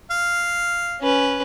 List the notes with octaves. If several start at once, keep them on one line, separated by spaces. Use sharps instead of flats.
F5
C#4 B4